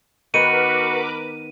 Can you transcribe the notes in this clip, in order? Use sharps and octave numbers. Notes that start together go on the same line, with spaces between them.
D#3 B3 F#4 A#4 B4 D6 D#7